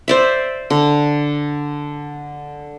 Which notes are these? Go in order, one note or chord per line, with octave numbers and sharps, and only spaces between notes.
C5 D5 E5
D3